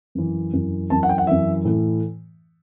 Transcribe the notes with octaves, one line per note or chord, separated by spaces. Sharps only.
F#2 E3
F#2 E3
F#2 E3 A5
F#5
G5
F#5
F#2 E3 E5
A2 E3